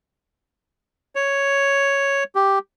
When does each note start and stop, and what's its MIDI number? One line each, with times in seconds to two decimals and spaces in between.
1.15 2.24 73
2.35 2.59 67